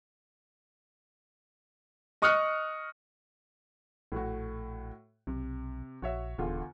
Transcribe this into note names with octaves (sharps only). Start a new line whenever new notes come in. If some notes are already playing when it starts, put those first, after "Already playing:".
D#5 C#6 D#6 F6 F#6 C#7
A#1 A2 A3 F#4
B1 C3
A#1 F#4 C#5 E5
D#1 E2 D3 F4